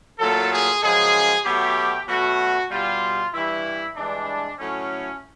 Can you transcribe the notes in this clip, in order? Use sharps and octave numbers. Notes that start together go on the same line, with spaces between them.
A#2 F#3 A3 A4
G#4
F#2 C#3 F3 G#3 G#4
B2 F#3 A3 G4
B2 F#3 A3 F#4
B2 G3 F4
G2 E3 G3 E4
G2 E3 G#3 D4
A2 F#3 A3 C#4